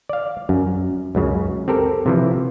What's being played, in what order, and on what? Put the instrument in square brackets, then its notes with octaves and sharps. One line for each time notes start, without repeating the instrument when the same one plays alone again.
[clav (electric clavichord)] D5 F5
F#2
C#2 F#2 C#3
C4 G4 A4 A#4
C3 E3 F3